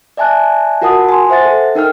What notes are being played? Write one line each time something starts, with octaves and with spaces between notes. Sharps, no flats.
D5 E5 G#5 A5 F#6
F4 F#4 A#4 F#5 A5 D#6
G#5 C6
C5 E5 F#5 A6
A4
D#4 A#4 G5 F6